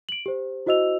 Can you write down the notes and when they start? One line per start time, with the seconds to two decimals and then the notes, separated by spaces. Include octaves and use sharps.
0.09 D7 F#7
0.26 G4 C5
0.66 E4 F#4 C5 D#5 E6 F7